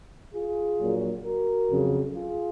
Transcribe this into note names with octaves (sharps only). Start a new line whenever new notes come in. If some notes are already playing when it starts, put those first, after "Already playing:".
F4 G#4
A#1 A#2 F#3
F#4 A#4
F2 C#3 F#3
F4 G#4